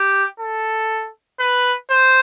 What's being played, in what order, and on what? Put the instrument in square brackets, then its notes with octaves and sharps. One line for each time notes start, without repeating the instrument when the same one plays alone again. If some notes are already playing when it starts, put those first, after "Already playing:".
Already playing: [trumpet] G4
A4
B4
C5